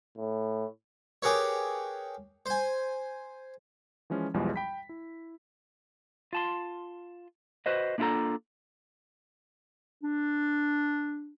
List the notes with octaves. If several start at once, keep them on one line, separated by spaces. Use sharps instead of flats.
A2
G4 G#4 A#4 B4 C#5
C5 G#5
E3 F3 G#3 C#4 F4
B1 E2 E3 F3 G3 G#3
G5 B5 B6
E4
F4 A5 C6
F#4 B4 C5 D#5
A#3 D4 E4 F4 A4 A#5
D4